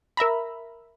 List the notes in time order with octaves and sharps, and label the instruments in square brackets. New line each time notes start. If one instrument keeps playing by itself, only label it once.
[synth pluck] A#4 E5 A#5 B5